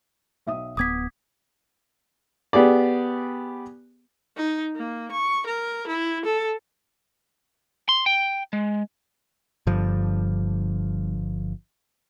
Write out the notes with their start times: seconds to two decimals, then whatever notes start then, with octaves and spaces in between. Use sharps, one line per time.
0.46 B1 E5 D#6
0.77 D1 B3 D6 D#6 G#6 B6
2.53 B3 G4 G#4 D5
4.37 D#4
4.76 A#3
5.11 C#6
5.46 A#4
5.87 E4
6.25 A4
7.89 C6
8.06 G5
8.53 G#3
9.67 G1 G2 D3 F3